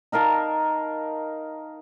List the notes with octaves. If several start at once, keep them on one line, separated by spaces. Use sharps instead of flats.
D#4 A#4 F5 A5